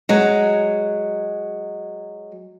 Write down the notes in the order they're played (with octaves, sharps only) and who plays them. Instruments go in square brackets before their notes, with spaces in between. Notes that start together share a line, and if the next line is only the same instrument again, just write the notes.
[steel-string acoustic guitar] F#3 G#3